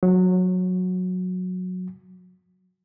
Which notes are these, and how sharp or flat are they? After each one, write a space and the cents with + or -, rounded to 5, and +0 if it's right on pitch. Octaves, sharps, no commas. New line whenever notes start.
F#3 -15